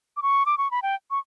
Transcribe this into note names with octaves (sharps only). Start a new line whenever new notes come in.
D6
C#6
D6
C#6
B5
G5
C#6